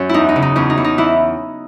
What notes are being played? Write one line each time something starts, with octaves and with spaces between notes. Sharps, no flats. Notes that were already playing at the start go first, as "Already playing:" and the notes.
Already playing: F#2 C#4
E2 D#4 E4
D#4
C#3
D#4
E2 C#4
D#4
E2
D#4
E3 E4